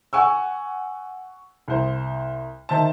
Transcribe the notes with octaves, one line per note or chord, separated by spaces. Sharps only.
F#5 G#5 C#6 E6
C2 C5
D#3 C5 E5 A5